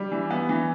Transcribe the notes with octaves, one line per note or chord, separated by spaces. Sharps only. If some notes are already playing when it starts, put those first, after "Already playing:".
Already playing: G3
E3
B3
E3